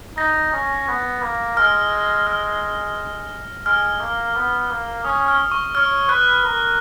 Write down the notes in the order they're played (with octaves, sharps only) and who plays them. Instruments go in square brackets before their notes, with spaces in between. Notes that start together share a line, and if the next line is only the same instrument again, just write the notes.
[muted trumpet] D#4 [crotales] A#6
[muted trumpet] C#4
B3
A#3
[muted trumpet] G#3 [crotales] F6
[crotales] F6
[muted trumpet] G#3 [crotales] F6
[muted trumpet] A#3
B3
A#3
[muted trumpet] C#4 [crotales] D#6
[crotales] F6
C#6
[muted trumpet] C#5 [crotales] F6
[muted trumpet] B4 [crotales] F#6
[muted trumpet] A#4